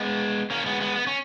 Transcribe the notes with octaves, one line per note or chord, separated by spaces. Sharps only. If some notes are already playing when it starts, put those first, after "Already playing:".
Already playing: G#3 B3
A#3 C#4
G#3 B3
G#3 B3
B3
C#4